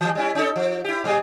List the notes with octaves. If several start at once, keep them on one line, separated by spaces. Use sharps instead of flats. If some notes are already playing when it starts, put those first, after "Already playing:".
E3 G3
G3 C#4 E4
C#4 D#4 A4
F3
E4 G4
A#2 G3 G#4